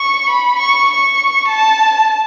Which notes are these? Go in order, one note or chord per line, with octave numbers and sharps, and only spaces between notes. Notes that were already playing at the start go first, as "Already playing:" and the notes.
Already playing: C#6
B5
C#6
C#6
A5